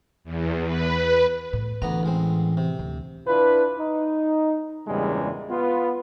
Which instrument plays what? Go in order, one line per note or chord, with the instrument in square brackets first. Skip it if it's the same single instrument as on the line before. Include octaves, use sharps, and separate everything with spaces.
[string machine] E2
B4
[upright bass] A2
[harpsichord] D2 B3 A#5 [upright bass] E3
[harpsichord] A1 G#3 C4
C3
[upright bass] D2
[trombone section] D4 E4 F4 B4
D#4
E2 G2 A#2 C#3 G3 G#3
B3 F4